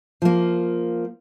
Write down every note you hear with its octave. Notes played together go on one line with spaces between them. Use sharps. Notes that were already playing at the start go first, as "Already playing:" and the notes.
F3 A#3